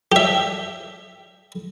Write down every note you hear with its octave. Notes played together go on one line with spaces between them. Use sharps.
G4 E5